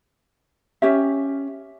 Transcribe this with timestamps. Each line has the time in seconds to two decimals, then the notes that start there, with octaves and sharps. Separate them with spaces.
0.82 C#4 G4 E5